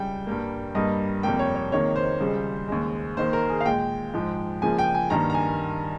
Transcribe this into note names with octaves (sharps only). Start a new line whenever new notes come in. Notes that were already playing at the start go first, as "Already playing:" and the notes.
Already playing: C#2 C#3 G3 G5
G2 G3 A#3
G2 G3 A#3 D#5
F2 C3 G3 A#3 G5
C#5
C#5
C#2 C3 D#3 A#3 C#5
C5
C#2 C#3 G3
D#2 C#3 G#3
D#2 D#3 A#3 C5
A#4
G#4
F5
A#2 G#3 G5
G#2 F3 G#3
C#2 C#3 F3 A#3 G#5
G5
G#5
G2 D#3 G3 A#3 A#5
A#5
G#5